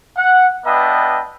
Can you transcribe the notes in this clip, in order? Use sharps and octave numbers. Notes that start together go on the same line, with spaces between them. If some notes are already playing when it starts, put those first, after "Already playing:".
F#5
B3 D4 B4 D#5 E5 G5